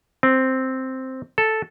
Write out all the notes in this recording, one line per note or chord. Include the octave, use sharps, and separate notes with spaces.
C4
A4